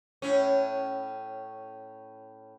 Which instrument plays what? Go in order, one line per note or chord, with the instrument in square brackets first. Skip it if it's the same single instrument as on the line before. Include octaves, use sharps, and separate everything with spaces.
[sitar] A2 C#4